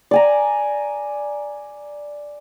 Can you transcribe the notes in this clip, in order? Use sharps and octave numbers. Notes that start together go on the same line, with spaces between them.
D5 G#5 A#5